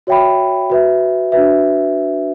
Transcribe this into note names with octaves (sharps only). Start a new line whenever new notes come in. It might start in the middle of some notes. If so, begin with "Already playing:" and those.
F#4 C#5 E5 G5 B5
F#4 B4 E5
D4 F#4 B4 E5